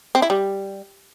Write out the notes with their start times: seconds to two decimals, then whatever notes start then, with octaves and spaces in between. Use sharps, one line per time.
0.15 C4
0.22 E4
0.30 G3